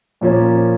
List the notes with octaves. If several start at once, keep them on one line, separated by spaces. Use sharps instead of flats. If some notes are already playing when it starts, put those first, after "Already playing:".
A#2 F3 A#3 C#4